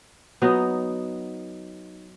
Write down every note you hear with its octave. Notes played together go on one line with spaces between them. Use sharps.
F#3 B3 D#4